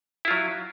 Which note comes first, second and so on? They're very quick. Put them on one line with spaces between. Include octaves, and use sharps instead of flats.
E4 F4 F#3